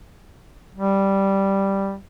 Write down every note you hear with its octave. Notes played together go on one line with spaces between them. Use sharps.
G3